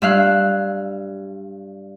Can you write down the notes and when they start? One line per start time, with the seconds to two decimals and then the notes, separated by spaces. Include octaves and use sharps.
0.02 G2 E5 F5 F#6